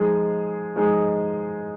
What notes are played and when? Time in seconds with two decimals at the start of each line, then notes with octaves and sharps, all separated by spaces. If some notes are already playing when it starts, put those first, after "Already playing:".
Already playing: F3 G#3 D#4 G#4
0.76 F3 G#3 D#4 G#4